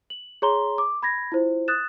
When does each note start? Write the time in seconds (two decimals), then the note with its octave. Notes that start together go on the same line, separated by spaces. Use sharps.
0.10 F#7
0.42 G#4 C#5 A#5 C6 G7
0.78 D6
1.03 B5 G#6 A#6
1.32 E4 F4 C5
1.68 D#6 F#6 A6 E7